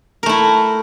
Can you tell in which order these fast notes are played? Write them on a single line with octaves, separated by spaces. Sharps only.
A#4 A3 E4